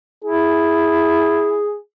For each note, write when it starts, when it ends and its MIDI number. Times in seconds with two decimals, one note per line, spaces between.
0.24 1.65 64
0.24 1.77 68